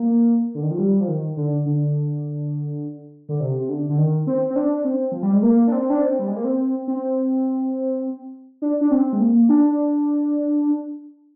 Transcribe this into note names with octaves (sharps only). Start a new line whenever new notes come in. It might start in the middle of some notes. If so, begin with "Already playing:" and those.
Already playing: A#3
D3
D#3
F3
G3
F3
D#3
D3
D3
D3
C3
C3
D3
D3
D#3
C4
C4
D4
C4
F3
G3
G#3
A#3
D4
C4
D4
C4
G3
G#3
A#3
C4
C4
D4
D4
C4
G#3
A#3
D4